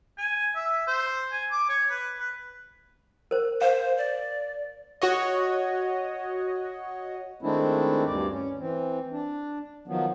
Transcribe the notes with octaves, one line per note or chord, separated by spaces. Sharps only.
G#5
E5
C5
G#5
D6
C#5
B4
B4
A#4 C5
C5 F5
D5
F#4 C#5 D#5
D#3 G#3 A3 C4 D4 E4
D2 G2 D5
C#4
E3 C4
D4
D#3 F3 F#3 B3